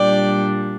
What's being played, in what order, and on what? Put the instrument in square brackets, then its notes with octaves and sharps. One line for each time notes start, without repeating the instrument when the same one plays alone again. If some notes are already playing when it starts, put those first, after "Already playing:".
Already playing: [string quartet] A#2 G3 D4 D5 G5